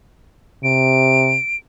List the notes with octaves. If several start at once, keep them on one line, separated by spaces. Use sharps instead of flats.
C3 D7